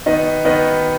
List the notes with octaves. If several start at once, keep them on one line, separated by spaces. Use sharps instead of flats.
D#3 B3 D#4 B4 D#5
D#3 B3 D#4 B4 D#5